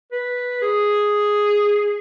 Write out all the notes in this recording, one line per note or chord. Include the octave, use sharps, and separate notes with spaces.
B4
G#4